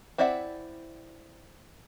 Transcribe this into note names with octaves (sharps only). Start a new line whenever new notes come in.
C4 E4 D5 E5 F#5